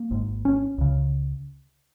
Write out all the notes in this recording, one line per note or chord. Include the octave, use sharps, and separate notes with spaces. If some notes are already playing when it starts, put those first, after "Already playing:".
Already playing: A#3
G#1 G#2
C#4
C#2 C#3